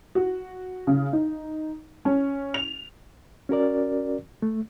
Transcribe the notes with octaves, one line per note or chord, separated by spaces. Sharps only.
F#4
C#3
D#4
C#4
F7
C#4 F#4 A#4 D5
A3